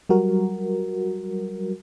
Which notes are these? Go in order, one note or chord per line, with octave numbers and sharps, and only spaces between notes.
F#3 G3 F#4 A#4